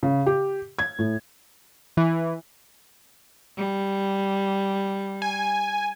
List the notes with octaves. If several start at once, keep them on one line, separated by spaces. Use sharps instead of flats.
C#3
G4
G#6
A2
E3
G3
G#5